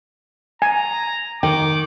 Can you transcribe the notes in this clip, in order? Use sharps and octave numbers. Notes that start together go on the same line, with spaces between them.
G#5 A#5
D#3 G5 D6